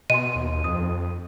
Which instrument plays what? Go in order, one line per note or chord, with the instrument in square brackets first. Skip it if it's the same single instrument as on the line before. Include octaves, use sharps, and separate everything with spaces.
[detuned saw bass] B2 [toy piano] D#5 G#5 C6 [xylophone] D#7
[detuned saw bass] D#2
[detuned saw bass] F2 [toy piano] D#6